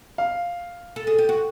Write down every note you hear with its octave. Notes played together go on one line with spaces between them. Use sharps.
F5
A4
G#4
G4
F#4